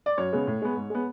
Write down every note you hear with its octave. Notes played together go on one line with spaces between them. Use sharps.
D5
F#2 C#5
C#3 G#3 B3
A2
G#3 B3
G#2
G#3 B3